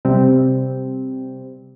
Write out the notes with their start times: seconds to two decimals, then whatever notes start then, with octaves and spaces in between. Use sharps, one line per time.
0.05 C3 G3 C4